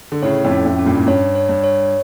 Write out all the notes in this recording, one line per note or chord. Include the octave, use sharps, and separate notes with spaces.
D3
A2 C#3 C#5
F2 A2
C#4
F2 A2
C#4
G2 A#2
A2
G2 C#5
C#5
G2
C#5